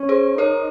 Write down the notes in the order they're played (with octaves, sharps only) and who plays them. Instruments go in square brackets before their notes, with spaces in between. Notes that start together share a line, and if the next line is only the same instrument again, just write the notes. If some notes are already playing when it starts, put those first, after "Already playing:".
Already playing: [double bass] C#4
[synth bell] G#4 C5
[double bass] D#4 [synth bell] A#4 C#5